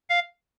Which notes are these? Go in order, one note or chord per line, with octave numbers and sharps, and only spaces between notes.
F5